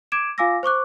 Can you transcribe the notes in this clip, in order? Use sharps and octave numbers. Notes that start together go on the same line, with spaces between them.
D6 G#6 D7 E7
F4 F5 G#5 D6 E6 A#6
C5 C#6 D6 F#6